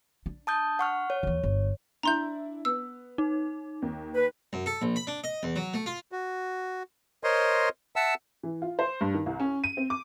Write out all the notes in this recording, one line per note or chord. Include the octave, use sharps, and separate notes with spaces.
D4
A5 D#6 G6
F#5 C#6 F6
C#5
D#2 E3
G1
D4 E4 A#5 C6 G6
B3 E6
D#4
D#2
B4
F#2
A4
A#1
B5
D4
D#5
E2
F#3
A3
F4
F#4
A#4 C5 C#5 D#5 C6
E5 F#5 A5 E6
E3
F4
C5
G2
D#3
C2
C#4
D#7
C4
D6